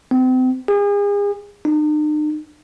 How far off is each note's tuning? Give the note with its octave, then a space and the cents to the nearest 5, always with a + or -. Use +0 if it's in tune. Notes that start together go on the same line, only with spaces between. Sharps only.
C4 -35
G#4 -40
D#4 -45